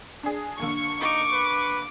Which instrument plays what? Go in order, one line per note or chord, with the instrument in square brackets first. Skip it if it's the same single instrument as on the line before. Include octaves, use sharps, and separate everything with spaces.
[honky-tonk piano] D4 G#4
[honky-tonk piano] D3 A#3 [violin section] C#6
[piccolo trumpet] D#4 [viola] D6
[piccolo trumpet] B4